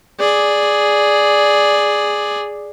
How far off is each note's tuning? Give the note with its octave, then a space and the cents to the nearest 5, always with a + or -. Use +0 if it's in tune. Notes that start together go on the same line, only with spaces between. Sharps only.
G#4 +0 D5 +0